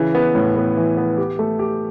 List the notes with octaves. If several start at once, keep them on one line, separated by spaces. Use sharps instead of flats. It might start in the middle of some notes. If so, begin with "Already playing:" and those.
Already playing: C#3 E3
B3
A2
B3
E3
B3
G4
A3
G4